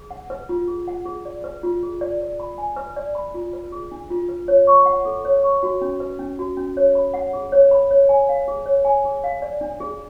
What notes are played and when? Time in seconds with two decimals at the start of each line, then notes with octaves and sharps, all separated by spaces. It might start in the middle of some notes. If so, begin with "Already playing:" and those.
Already playing: G#4
0.11 F#5
0.30 B4
0.49 F4
0.68 G#4
0.88 F#5
1.05 G#4
1.25 D5
1.44 B4
1.63 F4
1.83 G#4
2.01 D5
2.21 D5
2.40 B5
2.58 G#5
2.76 B4
2.96 D5
3.15 B5
3.34 F4
3.53 B4
3.72 G#4
3.91 D4
4.10 F4
4.29 B4
4.48 C#5
4.67 C#6
4.86 F#5
5.05 A4
5.25 C#5
5.43 C#6
5.63 F#4
5.81 C#4
6.00 B4
6.19 C#4
6.39 F#4
6.57 C#4
6.77 C#5
6.95 B5
7.14 F#5
7.33 G#4
7.52 C#5
7.71 B5
7.91 C#5
8.09 G#5
8.29 F5
8.48 G#4
8.66 C#5
8.85 G#5
9.05 G#4
9.24 F5
9.42 D5
9.61 D4
9.80 G#4